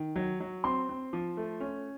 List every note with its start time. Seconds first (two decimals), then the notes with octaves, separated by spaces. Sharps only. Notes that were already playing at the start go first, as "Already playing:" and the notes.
Already playing: D#3
0.16 F#3
0.40 F#3
0.64 C4 C6
0.89 C4
1.13 F3
1.37 A3
1.60 C#4